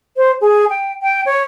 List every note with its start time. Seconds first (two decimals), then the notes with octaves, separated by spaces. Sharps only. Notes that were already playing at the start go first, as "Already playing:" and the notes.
0.17 C5
0.41 G#4
0.70 G5
1.02 G5
1.26 C#5